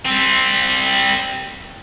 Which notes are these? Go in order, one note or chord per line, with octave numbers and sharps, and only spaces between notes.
G3 C4